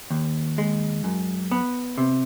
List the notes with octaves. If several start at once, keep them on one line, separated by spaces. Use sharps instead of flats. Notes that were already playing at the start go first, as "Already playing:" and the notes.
D#2
G#3
F#2
B3
C3